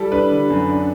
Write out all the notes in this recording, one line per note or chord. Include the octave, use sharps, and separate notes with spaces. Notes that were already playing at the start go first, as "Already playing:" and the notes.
Already playing: G3 E4 A4
D4 B4
D3
F#2
D4